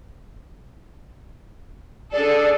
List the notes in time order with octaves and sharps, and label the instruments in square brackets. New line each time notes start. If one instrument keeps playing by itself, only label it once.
[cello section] D4 G#4 A4 [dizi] D5